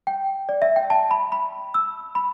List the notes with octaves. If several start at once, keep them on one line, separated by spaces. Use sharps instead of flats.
G5
D5
E5
G5
A5
B5
B5
E6
B5